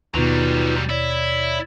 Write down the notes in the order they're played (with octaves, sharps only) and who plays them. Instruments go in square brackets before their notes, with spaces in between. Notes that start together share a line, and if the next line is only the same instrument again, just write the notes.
[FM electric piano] D#2 B2 [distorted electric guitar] F#3 G3 [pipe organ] D#4 F4 B4
[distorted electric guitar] E4 [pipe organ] C#5 D5